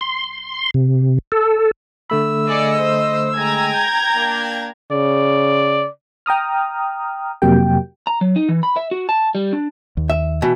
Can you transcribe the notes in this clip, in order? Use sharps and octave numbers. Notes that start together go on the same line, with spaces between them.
C6
C3
A4
D3 A3 B5 E6
G#4 D5 D#5 C#7
C5
G#3 G5 G#5 A#5 G#6
G6
A#3 D4
C#3 D5
G5 A#5 D#6 F6
F2 C3 F#3 A#3 G4 G5
A#5
F#3
D#4
E3
B5
E5
F#4
A5
G3
D4
D#2
E5
B2 E3